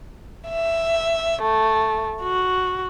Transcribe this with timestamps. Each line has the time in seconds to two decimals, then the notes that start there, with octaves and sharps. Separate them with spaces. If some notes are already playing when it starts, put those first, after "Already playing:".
0.48 E5
1.42 A3
2.22 F#4